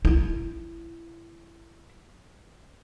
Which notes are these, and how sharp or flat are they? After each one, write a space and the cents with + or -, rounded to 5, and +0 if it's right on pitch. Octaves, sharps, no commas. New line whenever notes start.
E4 +25